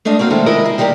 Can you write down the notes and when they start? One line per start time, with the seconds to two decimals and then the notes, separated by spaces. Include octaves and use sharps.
0.05 G#3 A3 D4 D#5 F5
0.19 A#3 C4 F#4 F5
0.30 D#3 G#3 A3 E4 A4 C5
0.46 D#3 F3 G#3 E4 A#4 D#5
0.65 G#4
0.78 D#3 G3 G#3 G4 A#4